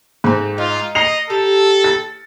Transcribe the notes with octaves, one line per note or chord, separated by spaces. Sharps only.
G#2 A3 C4
D#4 F4
D#5 A#5 C7 F7
G4 A4 A5
A6